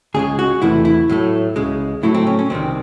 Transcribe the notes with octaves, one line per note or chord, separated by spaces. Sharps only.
C#2 C#3 G#3 G#4
F#4
E2 C3 E3 A3 E4
E4
A2 F#3 A3
C#2 C#3 G#3
A2 F#3 A3 E4
C4
C#4
C#4
C2 C3 D#3 C4